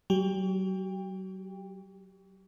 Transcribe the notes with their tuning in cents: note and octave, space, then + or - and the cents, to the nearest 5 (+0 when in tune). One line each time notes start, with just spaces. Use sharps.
F#3 +35 G4 +5 G5 +25